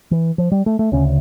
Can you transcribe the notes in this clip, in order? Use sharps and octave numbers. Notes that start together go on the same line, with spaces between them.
E3
F3
G3
A3
A3
D2 C#3 C#4